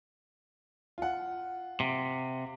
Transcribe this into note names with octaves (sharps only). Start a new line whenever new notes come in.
F4 F#5
C3